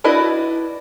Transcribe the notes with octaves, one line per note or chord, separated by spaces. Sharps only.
D4 E4 F#4 B4 D#5